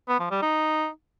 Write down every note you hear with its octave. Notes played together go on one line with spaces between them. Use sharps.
B3
F3
G3
D#4